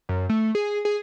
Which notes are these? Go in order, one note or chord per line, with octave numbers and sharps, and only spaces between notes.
F#2
A3
G#4
G#4